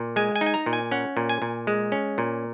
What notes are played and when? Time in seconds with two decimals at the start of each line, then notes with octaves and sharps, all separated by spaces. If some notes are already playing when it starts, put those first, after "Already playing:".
Already playing: A#2
0.16 G#3 G#5
0.36 G#5
0.41 D#4
0.46 G#5
0.54 A#5
0.66 A#2
0.73 G#5
0.91 C#4 F#5
1.17 A#2
1.29 G#5
1.42 A#2
1.67 G#3
1.92 C#4
2.18 A#2